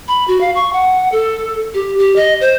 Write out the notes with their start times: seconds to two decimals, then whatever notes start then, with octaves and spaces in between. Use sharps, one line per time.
0.08 B5
0.28 F#4
0.41 F5
0.55 C#6
0.73 F#5
1.12 A4
1.74 G4
1.98 G4
2.16 D#5
2.41 C5